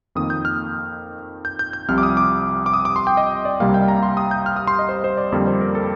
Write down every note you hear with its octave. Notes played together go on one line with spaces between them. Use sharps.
F2 D#3 A#3 D#6
G6
F6
G6
G6
G6
C2 C3 F3 F6
D6
D#6
D6
D6
D#6
D6
C6
G5
D#5
D5
C2 C3 G3 A#3 F5
G5
A#5
C6
D#6
G6
F6
D#6
C6
D#5
C5
C5
D5
F2 D3 G3 A#3 D5
C5
A#4
A4